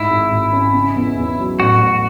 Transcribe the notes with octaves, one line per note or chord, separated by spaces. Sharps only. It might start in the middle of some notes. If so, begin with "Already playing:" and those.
Already playing: G#2 E4
G#1
G#1
C#4
C#3
E2
E2
F#3
A1 F#4
A1